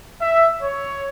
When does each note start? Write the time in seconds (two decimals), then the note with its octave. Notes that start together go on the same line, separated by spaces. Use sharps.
0.21 E5
0.62 C#5